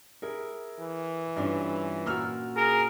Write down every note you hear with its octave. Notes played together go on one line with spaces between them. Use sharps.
E4 G#4 A#4
E3
G2 C#4 D4 F4
A#2 F#4 A#5 E6 F6
G#4 A#4